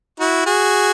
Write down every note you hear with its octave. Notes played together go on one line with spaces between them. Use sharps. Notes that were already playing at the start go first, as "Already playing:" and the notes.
E4 F#4
F#4 G#4